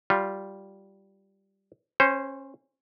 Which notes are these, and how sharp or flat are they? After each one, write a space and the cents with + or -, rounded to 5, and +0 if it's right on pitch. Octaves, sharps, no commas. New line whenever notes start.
G3 -5 F4 +0
C#4 -25 C5 +0